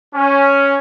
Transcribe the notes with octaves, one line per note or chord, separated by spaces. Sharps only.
C#4